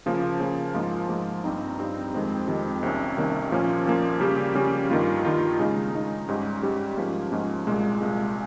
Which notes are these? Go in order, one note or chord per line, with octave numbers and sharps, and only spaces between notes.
C#3 F3 A#3
C#3 F3 A#3
G#2 F3 A#3 F4
G#2 F3 A#3 F4
G2 G3 C4 D#4
G2 G3 C4 D#4
F2 D#3 G#3 C4 G4
F2 D#3 G#3 C4 G4
C2 C3 D#3 A#3 C#4
C2 C3 D#3 A#3 C#4
A#2 F3 A#3 C#4
A#2 F3 A#3 C#4
C#3 G3 A#3 C#4 G4
C#3 G3 A#3 C#4 G4
G2 D#3 A#3 F4
G2 D#3 A#3 F4
C#3 G#3 D#4
C#3 G#3 D#4
G#2 G3 C#4 G4
G#2 G3 C#4 G4
G#2 F3 A#3 C#4
G#2 F3 A#3 C#4
C2 A#2 G#3
C2 A#2 G#3